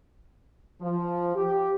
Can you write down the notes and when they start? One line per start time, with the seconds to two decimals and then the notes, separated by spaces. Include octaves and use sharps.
0.81 F3
1.35 G4